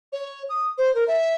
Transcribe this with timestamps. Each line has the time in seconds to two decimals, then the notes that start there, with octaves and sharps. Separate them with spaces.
0.13 C#5
0.49 D#6
0.78 C5
0.95 A#4
1.08 E5